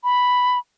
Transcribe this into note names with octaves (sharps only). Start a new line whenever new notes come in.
B5